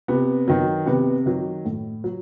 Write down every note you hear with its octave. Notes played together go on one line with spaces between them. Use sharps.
C3 B3
D#3 F#3
C3 B3
D#3 F#3
A2
F#3